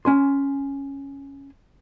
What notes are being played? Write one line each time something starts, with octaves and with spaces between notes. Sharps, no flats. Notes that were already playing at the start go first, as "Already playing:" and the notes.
C#4 G#5 C6